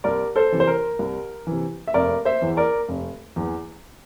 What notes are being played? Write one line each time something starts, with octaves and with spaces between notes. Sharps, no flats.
C2 A#4 D5
A4 C5
C3 E3
C5
A#4
C2
C3 E3
E5
F1 A#4 D5
C5 E5
E2 E3
A#4 D5
F1
E2 E3